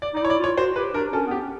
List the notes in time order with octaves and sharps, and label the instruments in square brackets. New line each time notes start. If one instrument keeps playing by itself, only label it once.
[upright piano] D5
[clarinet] D#4
[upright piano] D5
[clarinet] E4 [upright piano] C#5
[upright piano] D5
[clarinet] F4 [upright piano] C#5
[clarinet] F#4 [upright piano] C5
[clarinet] G4 [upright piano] B4
[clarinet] D4 [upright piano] A#4
[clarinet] C#4 [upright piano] A4
[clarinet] B3 [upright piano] G4
[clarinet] C#4